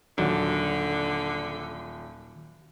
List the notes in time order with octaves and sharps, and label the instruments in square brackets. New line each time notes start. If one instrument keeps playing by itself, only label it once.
[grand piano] D#1 [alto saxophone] D3 [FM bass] D#3 [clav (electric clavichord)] F#3